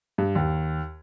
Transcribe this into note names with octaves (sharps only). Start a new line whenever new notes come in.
G2
D#2